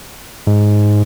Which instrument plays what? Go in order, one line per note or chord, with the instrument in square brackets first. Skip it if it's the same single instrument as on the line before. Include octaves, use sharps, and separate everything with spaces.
[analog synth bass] G#2